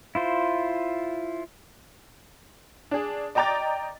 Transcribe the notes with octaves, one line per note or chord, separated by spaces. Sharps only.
E4 F4 C5
D4 G#4
D5 D#5 G5 A#5 D6 A6